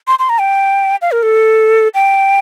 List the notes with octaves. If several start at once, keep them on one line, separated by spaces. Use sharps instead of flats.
C6
C6
A#5
G5
F5
A#4
A4
G5